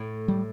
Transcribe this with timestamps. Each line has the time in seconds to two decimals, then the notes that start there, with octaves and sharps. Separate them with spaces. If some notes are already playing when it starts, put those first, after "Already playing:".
Already playing: A2
0.28 G3